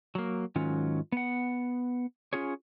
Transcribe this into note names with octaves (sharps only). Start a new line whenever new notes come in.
F#3 A#3
G#2 D#3 F#3 C#4 F4
B3 F#5
C#4 F4 G#4 C#5